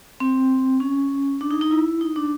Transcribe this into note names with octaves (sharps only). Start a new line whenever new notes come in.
C4
C#4
D4
D#4
D#4
E4
D#4
D4